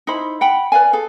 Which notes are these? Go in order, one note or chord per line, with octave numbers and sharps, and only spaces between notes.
D#4 E4 C5 B5
F#5 G5 B5
B4 D5 F5 G#5
G#4 A4